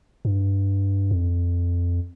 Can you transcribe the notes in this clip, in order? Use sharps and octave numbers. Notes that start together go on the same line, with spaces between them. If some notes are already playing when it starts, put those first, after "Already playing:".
G2
F2